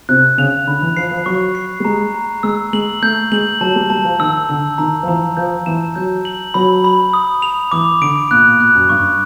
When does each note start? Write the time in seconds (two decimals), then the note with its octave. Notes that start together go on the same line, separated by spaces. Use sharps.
0.09 C3 F#6
0.38 C#3 F7
0.67 D3 B5
0.82 E3
0.97 F3 C7
1.11 F3
1.26 F#3 C#6
1.55 C7
1.80 G3
1.85 G#3 A#5
2.14 A#5
2.43 G#3 E6
2.73 G#3 F#7
3.02 A3 G6
3.32 G#3 F#7
3.61 F#3 A5
3.76 G3
3.90 G3 A5
4.05 F3
4.20 D#3 E6
4.49 D3 E6
4.78 D#3 A#5
5.03 F3
5.08 E3 A#5
5.37 F3 G6
5.66 E3 E7
5.95 F#3 G6
6.25 F#7
6.54 F#3 B5
6.84 B5
7.13 D#6
7.42 F7
7.72 E3 D6
8.01 D3 D7
8.31 A#2 F#6
8.46 A#2
8.60 A#2 F#6
8.75 F#2
8.89 G2 C#6